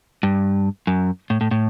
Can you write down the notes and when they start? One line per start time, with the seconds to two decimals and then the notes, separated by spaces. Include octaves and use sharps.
0.23 G2
0.87 F#2
1.30 A2
1.41 A2
1.51 A2